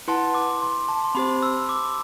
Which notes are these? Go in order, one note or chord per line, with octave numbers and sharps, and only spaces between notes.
E4 B4 F#5 A5 C6
D6
C6
A5
C6
C4 G4 C5 B5
E6
D6